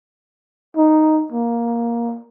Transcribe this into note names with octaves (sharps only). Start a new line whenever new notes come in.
D#4
A#3